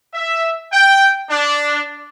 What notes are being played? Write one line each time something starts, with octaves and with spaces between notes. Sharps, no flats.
E5
G5
D4